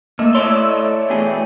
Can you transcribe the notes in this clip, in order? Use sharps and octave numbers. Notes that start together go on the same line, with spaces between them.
A3 A#3 D#5 E6
A2 C#5 D5 C6
B2 E3 G#4 G5